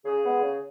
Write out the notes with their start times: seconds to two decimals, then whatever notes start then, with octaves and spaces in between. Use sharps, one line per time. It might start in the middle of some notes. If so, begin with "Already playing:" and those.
0.05 C#3 G#4
0.23 G#3 B3
0.42 C#3